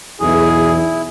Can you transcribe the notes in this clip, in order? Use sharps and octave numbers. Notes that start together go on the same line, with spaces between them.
B1 E2 E4 G#4